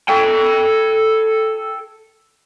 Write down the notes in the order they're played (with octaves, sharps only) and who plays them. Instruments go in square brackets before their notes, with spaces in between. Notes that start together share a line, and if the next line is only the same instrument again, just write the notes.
[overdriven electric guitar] A4 G5